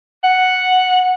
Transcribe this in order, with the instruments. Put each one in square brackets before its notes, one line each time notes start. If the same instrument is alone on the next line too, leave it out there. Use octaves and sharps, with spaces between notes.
[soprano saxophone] F#5